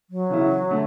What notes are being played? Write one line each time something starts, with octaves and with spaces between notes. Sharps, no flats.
F#3
C#3 E3 B3 E4
D3 A3